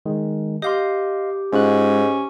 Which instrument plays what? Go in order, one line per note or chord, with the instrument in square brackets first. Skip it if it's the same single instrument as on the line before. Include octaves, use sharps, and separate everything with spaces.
[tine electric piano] D#3 G#3
[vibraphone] G4 D6 [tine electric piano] D#5 F5 C6
[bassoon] G#2 [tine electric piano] G#3 F4 F#6 [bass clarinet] C#4